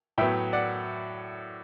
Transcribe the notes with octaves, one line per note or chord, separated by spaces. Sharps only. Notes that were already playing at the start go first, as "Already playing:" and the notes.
A2 F#3 B3 E5 G5
D5 F#5